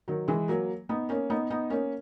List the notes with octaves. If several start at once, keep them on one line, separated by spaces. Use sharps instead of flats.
D#3 F#3
E3 G#3
F#3 A#3
B3 D#4
A#3 C#4
B3 D#4
B3 D#4
A#3 C#4